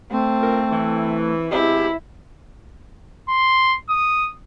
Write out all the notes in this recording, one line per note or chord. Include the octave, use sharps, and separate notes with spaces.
A3 C4
F4 A#4
E3
B2 G#3 C4 E4 G4
C6
D#6